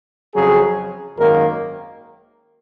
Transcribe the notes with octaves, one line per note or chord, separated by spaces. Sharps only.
F2 C#3 F#3 G#4
G#1 F#2 D#3 A#3 A#4